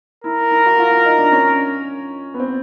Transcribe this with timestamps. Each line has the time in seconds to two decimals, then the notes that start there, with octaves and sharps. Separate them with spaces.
0.24 E4 A#4
0.51 E4
0.66 F#4
0.78 F4
0.91 F4
1.05 D#4
1.18 D4
1.32 C#4
2.34 B3
2.39 C4